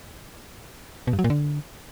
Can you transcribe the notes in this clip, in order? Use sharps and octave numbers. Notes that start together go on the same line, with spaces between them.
B2
G2
F#3
A#2
D3